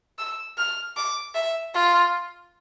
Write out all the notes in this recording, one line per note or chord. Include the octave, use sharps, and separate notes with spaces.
E6
F6
D6
E5
F4